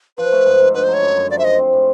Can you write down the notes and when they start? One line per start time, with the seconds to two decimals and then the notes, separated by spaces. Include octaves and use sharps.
0.18 F3 B4
0.32 A3
0.46 G#2
0.60 G#2
0.74 D3 B4
0.84 C5
0.88 F#3
0.93 C#5
1.02 F#2
1.16 F#2
1.31 F3 D5
1.38 E5
1.44 G#3 D#5
1.59 C4
1.73 A2